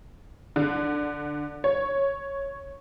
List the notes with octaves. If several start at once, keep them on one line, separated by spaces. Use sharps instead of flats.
D3
C#5